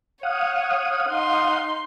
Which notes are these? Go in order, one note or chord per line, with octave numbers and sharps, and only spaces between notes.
C#5 F5 F#5 D#6
D#4 C6